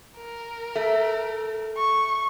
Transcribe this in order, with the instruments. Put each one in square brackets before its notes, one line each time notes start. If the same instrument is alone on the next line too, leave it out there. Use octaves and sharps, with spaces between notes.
[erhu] A#4
[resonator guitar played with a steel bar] A3
[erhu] C#6